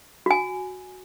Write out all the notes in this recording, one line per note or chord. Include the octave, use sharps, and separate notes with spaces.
F#4 G#5